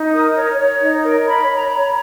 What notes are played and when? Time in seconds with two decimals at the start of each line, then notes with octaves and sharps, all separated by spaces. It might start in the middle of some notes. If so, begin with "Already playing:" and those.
Already playing: D#4
0.12 A#4 D#6
0.35 C#5
0.57 C#5
0.81 D#4
1.03 A#4
1.26 C#5 B5
1.49 C#5
1.57 A#5
1.67 C#5 B5
1.77 A#5